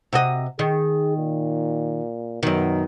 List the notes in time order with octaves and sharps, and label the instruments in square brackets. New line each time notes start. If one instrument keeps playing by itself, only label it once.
[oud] C3 F#4 D#5
[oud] D#3 [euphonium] G#4
[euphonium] A#2
[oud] F#2 D#3 [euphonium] B2